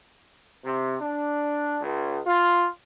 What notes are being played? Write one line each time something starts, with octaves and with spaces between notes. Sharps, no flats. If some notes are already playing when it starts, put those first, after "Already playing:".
C3
D4
C#2
F4